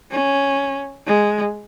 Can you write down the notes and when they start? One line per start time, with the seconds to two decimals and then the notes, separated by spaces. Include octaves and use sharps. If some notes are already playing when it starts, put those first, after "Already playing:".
0.11 C#4
1.07 G#3